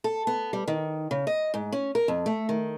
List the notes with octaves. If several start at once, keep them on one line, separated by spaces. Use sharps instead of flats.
A4
B3
G3
D#3
C#3
D#5
G#2
C#4
A#4
F2
A3
D#3